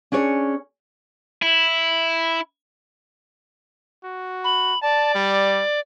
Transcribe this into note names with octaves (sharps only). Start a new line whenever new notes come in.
C#4 D4 G#4 C#5
E4
F#4
B5
D5 A5
G3